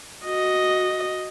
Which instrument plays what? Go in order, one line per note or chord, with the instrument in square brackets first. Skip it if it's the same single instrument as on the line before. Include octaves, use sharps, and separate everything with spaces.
[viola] F#4 D#5